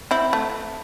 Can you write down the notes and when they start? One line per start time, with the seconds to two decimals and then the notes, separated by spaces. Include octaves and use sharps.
0.11 C4 E4
0.33 A3